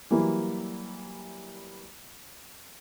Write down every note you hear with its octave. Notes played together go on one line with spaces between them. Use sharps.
E3 F#3 G3 A#3 E4